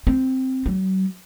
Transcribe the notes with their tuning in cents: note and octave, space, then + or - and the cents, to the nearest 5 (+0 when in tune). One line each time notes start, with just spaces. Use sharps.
C4 +0
F#3 +40